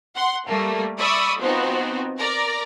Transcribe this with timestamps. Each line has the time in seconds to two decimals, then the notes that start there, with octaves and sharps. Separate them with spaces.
0.15 F#5 C6
0.47 G3 A3 A#3
0.98 D5 E5 B5 C#6 D#6
1.40 F3 B3 C4 D#4 F#4
2.18 A#4 D5 A#5